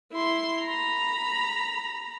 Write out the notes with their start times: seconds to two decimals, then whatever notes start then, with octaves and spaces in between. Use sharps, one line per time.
0.12 E4 C6
0.61 A#5 B5